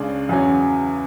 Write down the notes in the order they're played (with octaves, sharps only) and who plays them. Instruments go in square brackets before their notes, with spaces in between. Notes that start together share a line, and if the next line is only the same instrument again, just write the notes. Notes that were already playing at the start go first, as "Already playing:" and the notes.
Already playing: [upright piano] C#2 C#3 G#3 D4
E2 C#3 F#3 C#4